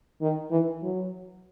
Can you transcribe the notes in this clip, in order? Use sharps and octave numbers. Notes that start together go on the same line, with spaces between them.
D#3
E3
F#3